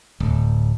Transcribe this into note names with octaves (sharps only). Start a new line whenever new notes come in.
D1